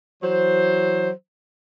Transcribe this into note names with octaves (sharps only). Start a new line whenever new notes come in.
E3 F#3 C5